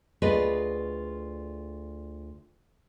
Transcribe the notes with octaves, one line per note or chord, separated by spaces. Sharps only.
D2 F4 G#4 B4 D5 D#5